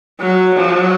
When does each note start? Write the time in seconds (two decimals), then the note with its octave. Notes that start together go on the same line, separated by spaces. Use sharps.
0.20 F#3
0.56 F#3